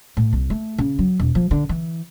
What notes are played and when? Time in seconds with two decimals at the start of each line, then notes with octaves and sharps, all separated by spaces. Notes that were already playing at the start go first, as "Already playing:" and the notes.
0.17 A2
0.33 C2
0.50 A3
0.78 C#3
0.99 F#3
1.20 E1
1.35 F3
1.51 D3
1.69 E3